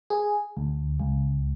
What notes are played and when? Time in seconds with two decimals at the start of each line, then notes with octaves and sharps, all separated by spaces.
0.10 G#4
0.57 D2
1.00 C#2